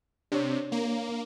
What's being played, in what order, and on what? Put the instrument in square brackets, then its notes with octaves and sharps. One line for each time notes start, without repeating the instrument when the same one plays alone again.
[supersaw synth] C3 [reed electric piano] D4 C#5
[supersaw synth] A#3